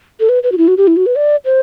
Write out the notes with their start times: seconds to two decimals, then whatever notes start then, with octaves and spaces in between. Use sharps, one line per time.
0.20 A4
0.29 B4
0.43 B4
0.52 F#4
0.58 E4
0.68 F#4
0.77 G4
0.87 E4
0.97 F#4
1.06 B4
1.16 D5
1.45 C5